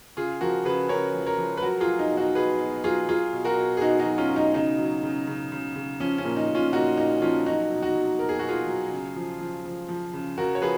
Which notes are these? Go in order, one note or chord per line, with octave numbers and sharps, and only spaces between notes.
C#3 F4 G#4
F3 F#4 A#4
C#3 G#4 B4
C#3 A#4 C#5
F3
A#4 C#5
F3
B4
F#3 F#4 A#4
F4 G#4
F#3
D#4
B2
D#4 F#4
B2 G#4 B4
B2
F#3 F4 G#4
F#3 F4 G#4
B2
F#4 A#4
B2
G#4
B2 D#4 F#4
D#4 F#4
F#3
C#4 F4
B2
D#4
C#3 D#4
F#3
C#3
C#3
C#3
C#3
F3 C#4
C#4
A#2
D#4
A#2
C#4 F4
A#2 D#4 F#4
A#2 D#4
F3 C#4 F4
F#3 D#4 F#4
B2
D#4 F#4
F#3
B2 A#4
G#4
B2 F#4
F4 G#4
F#3
C#3
F3
F3
F3
F3
C#3
C#3 F#4 A#4
C#5
F3 G#4 B4